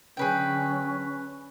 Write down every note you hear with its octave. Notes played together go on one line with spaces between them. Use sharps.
D3 F#3 C#4 G#4 B4 G5